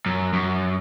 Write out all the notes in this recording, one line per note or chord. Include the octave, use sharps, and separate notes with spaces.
F#2
F#2